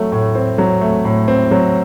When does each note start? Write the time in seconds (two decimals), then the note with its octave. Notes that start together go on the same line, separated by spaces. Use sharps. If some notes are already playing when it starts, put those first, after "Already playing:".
Already playing: F#3 A3
0.12 A2
0.35 C4
0.58 F#3
0.81 A3
1.05 A2
1.28 C4
1.51 F#3